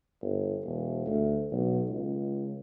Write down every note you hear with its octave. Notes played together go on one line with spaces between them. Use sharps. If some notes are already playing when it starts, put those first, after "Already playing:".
G1
E1
D2
B1
C#2